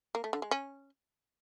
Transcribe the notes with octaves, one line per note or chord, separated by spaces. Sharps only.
A#3
A3
D3
G#3
C#4